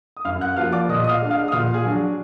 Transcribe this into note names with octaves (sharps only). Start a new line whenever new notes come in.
D#6
F#2 F5 F6
F#5 F#6
F3 A#3 F4 F5 F6
D5 D6
A#2 D#5 D#6
D#6
F5 F6
G#3 D4
F5 F6
D#6
A#2 F5 F6
G#4 G#5
F#3 D4